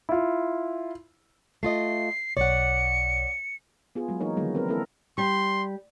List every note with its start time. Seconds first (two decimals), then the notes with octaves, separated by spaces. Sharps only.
0.09 E4 F4
1.63 A3 F4 D#5 C7
2.37 B1 C#5 D5 F#5 C#7
3.95 B3 F4 G#4
4.08 F#3 G#3
4.20 E3 A#3 D#4 A#4 C#5
4.37 D3 D#3 F3 F#3 G#3 B3
4.55 C4 A#4 B4
4.69 A#3 C4 E4 A4 A#4
5.18 G3 C6